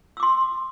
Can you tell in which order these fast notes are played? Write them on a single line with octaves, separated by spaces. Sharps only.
E6 D6 C6